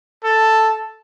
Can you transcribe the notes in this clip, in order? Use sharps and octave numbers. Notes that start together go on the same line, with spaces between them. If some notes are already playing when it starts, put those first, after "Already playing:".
A4